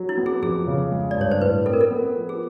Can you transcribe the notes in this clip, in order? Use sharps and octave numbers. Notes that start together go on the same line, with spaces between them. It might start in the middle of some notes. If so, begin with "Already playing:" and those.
Already playing: F#3
E4
B3
G#4
F2 G#4
C#3
G#3
D5
G2 C#5
C5
A2 B4
C4 A4
A#4
A4
B3
F3
G#4